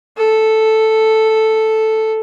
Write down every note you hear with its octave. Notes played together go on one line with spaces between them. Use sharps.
A4